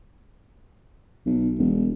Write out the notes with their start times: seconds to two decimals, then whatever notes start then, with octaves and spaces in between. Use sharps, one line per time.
1.26 B1
1.58 E1